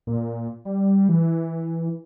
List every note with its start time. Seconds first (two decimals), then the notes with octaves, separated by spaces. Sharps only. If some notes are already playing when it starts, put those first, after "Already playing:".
0.07 A#2
0.65 G3
1.09 E3